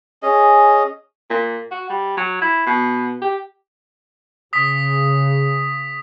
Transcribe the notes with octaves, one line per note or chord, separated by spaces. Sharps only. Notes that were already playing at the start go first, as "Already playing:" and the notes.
C#4 G#4 D#5
A#2
F#4
G3
F#3
E4
B2
G4
C#3 D#6 B6